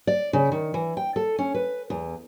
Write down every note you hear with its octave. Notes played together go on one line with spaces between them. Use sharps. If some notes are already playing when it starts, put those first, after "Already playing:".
D5
C#3
D#3
E3
G5
A4
C#4
B4
E2